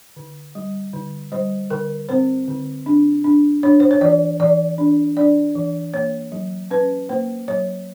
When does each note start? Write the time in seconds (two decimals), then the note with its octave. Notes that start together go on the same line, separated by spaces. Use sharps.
0.16 D3
0.55 G3
0.93 D3
1.32 G3 C5
1.70 D3 A#4
2.09 C4 C5
2.48 D3
2.86 D4
3.24 D4
3.63 D4 C#5
3.80 C5
3.91 C#5
4.01 E3 D5
4.40 E3 D5
4.78 D4
5.17 D4 D5
5.55 E3
5.94 A#3 C#5
6.32 F#3
6.71 C#4 B4
7.09 A#3 C5
7.48 F#3 C#5